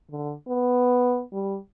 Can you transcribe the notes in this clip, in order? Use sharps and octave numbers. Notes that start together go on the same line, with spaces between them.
D3
B3
G3